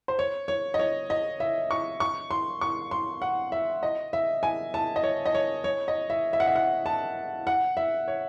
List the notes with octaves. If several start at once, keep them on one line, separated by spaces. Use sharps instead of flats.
C5
C#5
C#5
D#5
C#5
D#5
E5
C#6
C#6
C6
C#6
C6
F#5
E5
D#5
E5
G#5
A5
D#5
C#5
D#5
C#5
C#5
D#5
E5
E5
F#5
E5
F#5
A5
F#5
E5
C#5